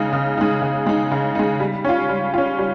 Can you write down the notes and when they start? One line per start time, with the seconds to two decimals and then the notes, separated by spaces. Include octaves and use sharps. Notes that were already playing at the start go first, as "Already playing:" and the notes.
Already playing: C#3 G#3 D#4
0.13 C#3
0.37 G#3 D#4
0.62 C#3
0.86 G#3 D#4
1.11 C#3
1.35 G#3 D#4
1.60 G3
1.84 C#4 F4
2.09 G3
2.34 C#4 F4
2.58 G3